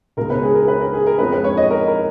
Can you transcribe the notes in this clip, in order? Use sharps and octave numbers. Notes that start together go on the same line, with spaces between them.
C#2 B2 G#3 A#4
B4
G#4
A#4
B4
A#4
G#4
A#4
F2 F3 G#3 B4
B4
C#5
D#5
A#4
A#4